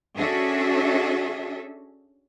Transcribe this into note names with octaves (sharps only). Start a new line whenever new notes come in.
C#4 D4 F#4 G#4 A4 E5